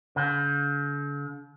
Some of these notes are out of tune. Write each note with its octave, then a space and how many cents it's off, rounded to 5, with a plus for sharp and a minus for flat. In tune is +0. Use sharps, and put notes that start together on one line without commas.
D3 -45